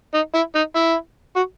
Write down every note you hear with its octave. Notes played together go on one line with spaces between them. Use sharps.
D#4
E4
D#4
E4
F#4